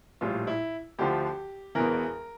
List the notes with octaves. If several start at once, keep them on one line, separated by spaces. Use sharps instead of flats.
A#1 A2 G3 F4
E4
D2 D3 F3 G4
E1 E2 E3 A#4